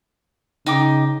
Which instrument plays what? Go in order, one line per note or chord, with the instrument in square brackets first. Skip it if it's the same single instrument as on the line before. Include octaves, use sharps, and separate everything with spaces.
[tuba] C#3 [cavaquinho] D#4 G5 D6